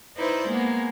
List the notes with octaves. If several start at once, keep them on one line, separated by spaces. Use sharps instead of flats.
D#4 E4 B4 C5 D5
G#3 A#3 B3